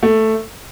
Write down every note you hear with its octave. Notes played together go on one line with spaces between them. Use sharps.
A3